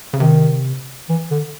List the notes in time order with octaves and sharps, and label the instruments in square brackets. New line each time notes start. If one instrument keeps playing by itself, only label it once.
[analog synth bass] C#3
[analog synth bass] C3 [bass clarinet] D#3
[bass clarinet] E3
D3